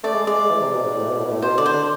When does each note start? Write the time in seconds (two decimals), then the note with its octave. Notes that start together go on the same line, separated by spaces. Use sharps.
0.03 A3 D5
0.15 G#3
0.27 G#3 D5
0.39 G#3
0.51 E3
0.62 C3
0.74 B2
0.85 G#2
0.96 A2
1.08 B2
1.20 A2
1.26 B2
1.32 A2
1.42 B2 C5
1.58 D3 D5
1.66 C5
1.74 D3